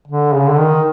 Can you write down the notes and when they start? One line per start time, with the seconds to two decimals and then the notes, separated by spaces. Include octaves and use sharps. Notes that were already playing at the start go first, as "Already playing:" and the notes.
0.08 D3
0.33 C#3
0.49 D3
0.59 D#3